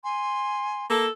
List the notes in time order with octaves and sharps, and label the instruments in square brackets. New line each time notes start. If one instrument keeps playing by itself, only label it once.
[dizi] G#5 [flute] C6
[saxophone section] A#3 A4